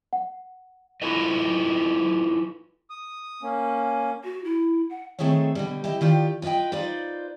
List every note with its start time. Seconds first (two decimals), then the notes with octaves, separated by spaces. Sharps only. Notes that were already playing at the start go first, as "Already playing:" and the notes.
0.13 F#5
1.02 E4 F4 A4 B4 D#5
2.90 D#6
3.43 A#3 C#4
4.24 F#4
4.44 E4
4.90 F#5
5.19 D#3 A3 C4 G#4 A4 C#5
5.55 B2 D3 G3
5.84 E4 G4 D#5
6.01 D#3 F4 G4 D5
6.42 F4 B4 D5 D#5 G5
6.72 D#4 F4 B4 C5 D5 F5